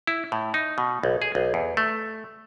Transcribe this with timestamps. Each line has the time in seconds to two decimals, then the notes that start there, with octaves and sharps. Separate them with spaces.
0.07 E4
0.32 A2
0.54 D#4
0.78 B2
1.03 B1
1.22 G#4
1.35 B1
1.54 E2
1.77 A3